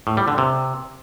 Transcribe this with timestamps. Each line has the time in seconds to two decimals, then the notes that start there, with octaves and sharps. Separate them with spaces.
0.07 A2
0.17 G3
0.28 D3
0.38 C3